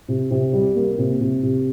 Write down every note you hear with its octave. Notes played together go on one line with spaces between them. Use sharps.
C3
C3
G3
A#3
C3
C3
C3